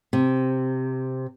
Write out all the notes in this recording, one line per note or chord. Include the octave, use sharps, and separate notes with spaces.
C3